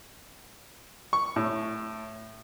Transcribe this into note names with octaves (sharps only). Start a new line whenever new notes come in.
C#6
A2